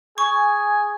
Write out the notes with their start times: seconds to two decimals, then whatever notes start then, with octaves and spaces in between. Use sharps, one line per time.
0.18 G#4 G#5 C#6